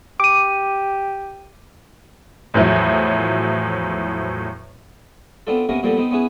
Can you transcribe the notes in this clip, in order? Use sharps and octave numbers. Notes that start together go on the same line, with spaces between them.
G4 D6 D#7
E2 A2 F3 F#3 E4
B3 C4 D4 F4 A4
C3 A#3 B3 C#4 A#4
A#2 F3 G3 A#3 B3 A4
B3 C4 D#4
B3 C#4 E4 G#4 B4